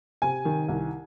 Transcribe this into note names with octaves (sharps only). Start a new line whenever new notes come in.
C3 G#5
D#3
C2